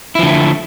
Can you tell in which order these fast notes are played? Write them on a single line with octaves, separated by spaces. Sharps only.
E4 F3 D3 A3